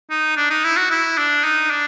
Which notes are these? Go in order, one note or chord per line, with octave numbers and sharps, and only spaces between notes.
D#4
D4
D#4
E4
F#4
E4
D4
D#4
D4